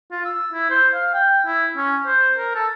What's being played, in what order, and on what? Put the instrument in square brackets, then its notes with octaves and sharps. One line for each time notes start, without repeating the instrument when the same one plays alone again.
[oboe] F4
E6
E4
C5
F5
G5
E4
C#4
C5
A#4
A4